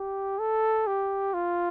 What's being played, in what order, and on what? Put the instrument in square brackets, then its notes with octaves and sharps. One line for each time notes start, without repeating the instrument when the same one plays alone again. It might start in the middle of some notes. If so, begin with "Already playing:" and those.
Already playing: [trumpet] G4
A4
G4
F4